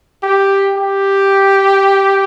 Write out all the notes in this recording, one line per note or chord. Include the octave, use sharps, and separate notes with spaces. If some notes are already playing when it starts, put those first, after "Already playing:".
G4
G4